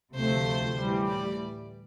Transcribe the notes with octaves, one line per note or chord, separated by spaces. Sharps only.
D2 C3 F3 A3 C5
A2 E3 G3
D5